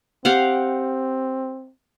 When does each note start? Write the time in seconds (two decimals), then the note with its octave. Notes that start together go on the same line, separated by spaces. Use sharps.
0.25 C4 G4 F5 F#5